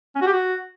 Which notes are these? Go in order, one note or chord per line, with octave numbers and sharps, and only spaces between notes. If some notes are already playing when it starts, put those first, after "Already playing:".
C#4
F#4
G4
F#4